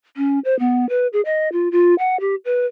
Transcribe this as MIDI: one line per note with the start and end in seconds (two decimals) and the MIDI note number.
0.17 0.39 61
0.45 0.57 72
0.59 0.88 59
0.89 1.07 71
1.13 1.21 68
1.25 1.49 75
1.52 1.69 65
1.72 1.94 65
1.99 2.19 78
2.20 2.35 67
2.45 2.66 71